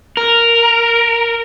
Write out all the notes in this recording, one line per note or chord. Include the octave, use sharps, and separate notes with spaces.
A#4